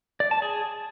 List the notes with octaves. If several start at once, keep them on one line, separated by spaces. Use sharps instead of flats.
D5
A5
G#4